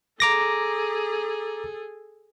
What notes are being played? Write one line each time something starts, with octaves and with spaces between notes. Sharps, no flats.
G#4 A4 A#5 D6 A#6